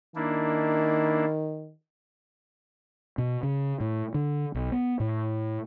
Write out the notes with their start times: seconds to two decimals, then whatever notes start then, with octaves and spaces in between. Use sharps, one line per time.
0.16 D#3 A#3 D4 E4
3.18 B2
3.43 C#3
3.80 A2
4.14 D3
4.54 B1
4.72 B3
5.00 A2